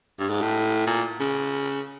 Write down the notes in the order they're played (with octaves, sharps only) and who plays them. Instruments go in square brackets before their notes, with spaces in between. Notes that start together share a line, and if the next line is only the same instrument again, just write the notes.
[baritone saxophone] G2
G#2
A2
A#2
C#3